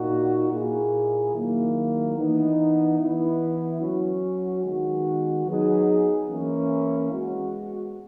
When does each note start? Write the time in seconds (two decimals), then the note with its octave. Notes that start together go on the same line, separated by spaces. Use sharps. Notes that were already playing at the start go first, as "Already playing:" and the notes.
Already playing: A#2 A#3 D#4 F#4
0.51 A#2 A#3 E4 G#4
1.34 D#3 F#3 A#3 E4
2.16 E3 B3 D#4
2.98 E3 B3 E4
3.81 F#3 C#4 F#4
4.64 D#3 G#3 B3 F#4
5.46 F#3 B3 D#4 G#4
6.28 E3 A#3 C#4 E4
7.11 G#3 B3 F#4